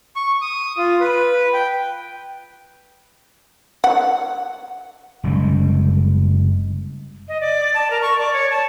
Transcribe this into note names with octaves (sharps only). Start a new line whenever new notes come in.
C#6
D#6
F4
B4
G5
F#5
F#1 C3 G3 G#3
D#5
D5
A5
A#4
C#6
D5
C#5
A5